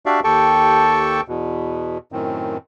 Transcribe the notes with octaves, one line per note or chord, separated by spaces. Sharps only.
D4 F#4 G4 D5 E5 F5
D#2 G4 A4 G5 A5 C#6
E2 B2
F#2 A2 D#3 C4